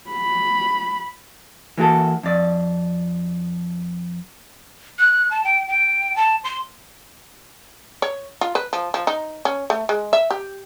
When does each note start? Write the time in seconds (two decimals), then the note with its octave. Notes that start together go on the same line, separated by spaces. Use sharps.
0.10 B5
1.78 E3 A#3 F#4 A4
2.23 F2 D5
4.99 F#6
5.31 A5
5.44 G5
5.68 G5
6.16 A5
6.44 C6
8.02 C#5
8.41 F4
8.55 B4
8.73 F3
8.94 F3
9.07 D#4
9.45 C#4
9.70 A3
9.89 G#3
10.13 E5
10.31 G4